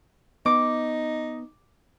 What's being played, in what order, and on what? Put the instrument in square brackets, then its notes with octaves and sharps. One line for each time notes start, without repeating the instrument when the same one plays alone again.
[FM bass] B3 [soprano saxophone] D#4 [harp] D6